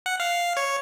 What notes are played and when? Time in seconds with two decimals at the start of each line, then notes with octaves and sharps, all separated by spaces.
0.06 F#5
0.20 F5
0.57 C#5